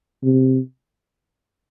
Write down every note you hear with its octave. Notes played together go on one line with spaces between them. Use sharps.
C3